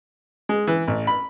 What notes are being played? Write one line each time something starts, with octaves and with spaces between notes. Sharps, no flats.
G#3
E3
A1
B5